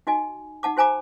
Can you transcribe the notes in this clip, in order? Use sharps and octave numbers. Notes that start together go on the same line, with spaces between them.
D#4 F#4 D#5 G#5
D#4 F#5 A5 D6
F#4 C5 G#5 A#5 D6